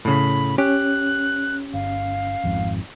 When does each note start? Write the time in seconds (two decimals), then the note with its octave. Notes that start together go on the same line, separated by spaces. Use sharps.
0.05 A2 C#3 B5
0.58 C#4 G4 F#6
1.73 G1 F5
2.44 G#1 F2 G#2